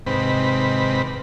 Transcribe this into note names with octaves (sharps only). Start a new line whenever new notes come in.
G#2 C3 D#3 C4 B4 B5